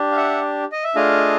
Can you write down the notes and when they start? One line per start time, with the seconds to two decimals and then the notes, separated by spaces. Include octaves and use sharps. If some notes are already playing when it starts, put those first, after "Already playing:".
Already playing: D4 G4
0.12 F5
0.16 E5 F#5
0.72 D#5
0.84 E5
0.95 A3 D4 F4 G#4 D#5 F5